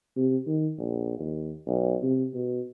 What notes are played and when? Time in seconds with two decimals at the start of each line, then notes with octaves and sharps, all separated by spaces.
0.16 C3
0.47 D#3
0.78 A#1
1.19 D#2
1.67 B1
2.03 C3
2.34 B2